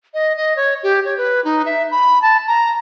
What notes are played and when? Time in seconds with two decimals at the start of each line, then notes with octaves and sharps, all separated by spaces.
0.14 D#5
0.37 D#5
0.56 C#5
0.83 G4
1.05 C#5
1.17 B4
1.44 D#4
1.66 E5
1.91 B5
2.22 A5
2.47 A#5